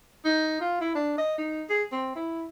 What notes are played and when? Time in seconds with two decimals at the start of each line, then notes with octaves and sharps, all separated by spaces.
0.25 D#4
0.61 F4
0.80 E4
0.95 D4
1.18 D#5
1.38 D#4
1.69 G#4
1.92 C4
2.15 E4